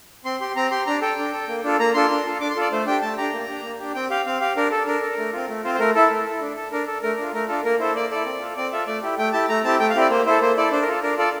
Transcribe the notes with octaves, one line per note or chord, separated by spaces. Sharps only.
C4 C6
G4 C6
C4 A#5
G4 C6
D4 A#5
A4 G5
D4
A4
A#3
D4 F4 A4
A#3 A#5
D4 F4 A4 C6
D4
F4 A4
D4 D6
C6
F4 A4 D5
A3 C5
D4 G4 G5
A3 A5
D4 G4 A#5
A#3
D4 G4
A#3
D4 G4
C4 G5
G4 F5
C4 F5
G4 F5
D4 A#4
A4
D4 A#4
A4
A3
C4 F4
A3
C4 F4 C5
C5
A3 A#4
E4 A4
A3
E4 A4
D4
A4
D4 A#4
A4
A3 A#4
D4 F4
A3 A#4
D4 F4 A4
A#3 A#4
E4 A4 C5
A#3 D5
E4 A4 D5
C4
F4 A4
C4 D5
F4 A4 E5
A3 D5
E4 G4
A3 G5
E4 G4 A5
A3 A#5
C4 E4 G4 A5
A3 G5
F5
C4 E4 G4 D5
A#3 C5
E4 A4 C5
A#3 C5
E4 A4 D5
D4 C5
A#4
F4 A4
D4 A#4
F4 A4 D5